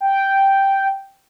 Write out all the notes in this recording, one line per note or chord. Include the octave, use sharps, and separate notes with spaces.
G5